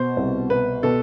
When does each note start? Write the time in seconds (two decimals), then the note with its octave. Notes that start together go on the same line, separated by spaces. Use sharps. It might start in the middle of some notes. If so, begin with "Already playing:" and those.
Already playing: B2 C5
0.17 C2
0.50 B2 B4
0.83 B2 A4